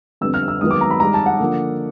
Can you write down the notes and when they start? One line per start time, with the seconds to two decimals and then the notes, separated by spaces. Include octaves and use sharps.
0.21 F2 D3 G3 B3 E6
0.34 F6
0.48 E6
0.60 G#2 D#3 F#3 B3 D#6
0.71 D6
0.81 A#5
0.91 B5
1.00 G#2 D#3 G3 A#5
1.14 A5
1.26 F#5
1.39 D3 F3 A#3